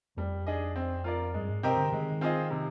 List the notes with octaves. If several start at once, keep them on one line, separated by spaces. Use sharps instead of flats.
F2 G3
D4 G#4 D#5
C4
F4 A#4 D5
G2 G#3
G#2
C3 C4 G4 A#4 D#5
D3
D#3 G#3
C4 F4 G#4 D#5
C3